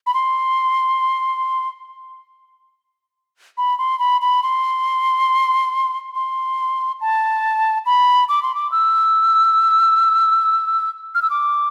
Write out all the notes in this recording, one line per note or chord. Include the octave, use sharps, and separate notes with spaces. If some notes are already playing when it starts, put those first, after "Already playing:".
B5
C6
B5
C6
B5
B5
C6
C6
A5
B5
D6
C6
D6
E6
F6
E6
D6